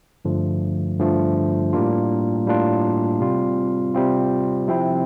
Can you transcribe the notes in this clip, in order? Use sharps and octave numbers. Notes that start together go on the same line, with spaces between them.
G2 D3 F3 A3
G2 D3 F3 A3
A2 G3 A#3 D4 F4
A2 G3 A#3 D4 F4
C3 G3 C4 F4
C3 G3 C4 F4
C3 F3 C4 E4